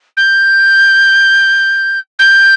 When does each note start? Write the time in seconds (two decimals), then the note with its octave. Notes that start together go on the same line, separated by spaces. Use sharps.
0.17 G6
2.19 G6